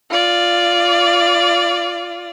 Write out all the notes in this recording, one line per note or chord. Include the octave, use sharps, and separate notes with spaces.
F4 D5